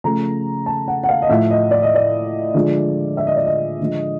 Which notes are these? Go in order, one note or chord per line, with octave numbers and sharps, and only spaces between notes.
C#3 F3 A3 A#5
A5
F#5
F#5
F5
D#5
A2 F3 A3 E5
D#5
D5
D#5
D5
D3 F3 G#3
E5
D#5
D5
D#5
D3 F3 G#3